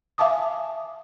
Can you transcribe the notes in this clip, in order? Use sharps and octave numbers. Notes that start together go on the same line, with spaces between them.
E5 F5 G#5 A5 D6 D#6